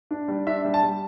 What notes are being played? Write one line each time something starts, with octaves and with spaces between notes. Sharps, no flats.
D4
G3
D4 E5
G3
A5
G3